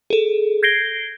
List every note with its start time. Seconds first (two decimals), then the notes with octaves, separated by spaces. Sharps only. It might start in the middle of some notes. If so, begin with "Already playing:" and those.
0.10 G#4 A4
0.63 G6 G#6 A#6 C7 D7 G7